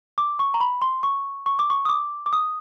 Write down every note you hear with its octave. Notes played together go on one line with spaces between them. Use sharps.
D6
C#6
A#5
B5
C6
C#6
C#6
D6
C#6
D#6
D6
D6
D#6